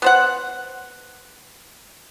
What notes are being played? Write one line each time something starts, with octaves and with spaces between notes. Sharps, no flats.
B3 C5 F#5